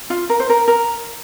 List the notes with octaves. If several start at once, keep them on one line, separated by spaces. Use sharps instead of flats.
F4
A#4
C5
A#4
A#4